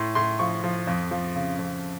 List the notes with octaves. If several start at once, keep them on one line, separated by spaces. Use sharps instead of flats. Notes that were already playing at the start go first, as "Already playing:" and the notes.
Already playing: A2 C6
A2 C6
F3 C#6
F3
F2
F3
C#3
F2